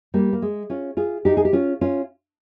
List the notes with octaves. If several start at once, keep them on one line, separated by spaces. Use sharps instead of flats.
G3 A#3
A#3
G#3
C#4 F4
F4 G#4
D#4 G4
G#4
G4
C#4 F4
C#4 F4